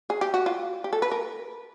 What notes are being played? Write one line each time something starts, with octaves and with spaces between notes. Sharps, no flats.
G#4
G4
F#4
F4
G4
A4
B4
A#4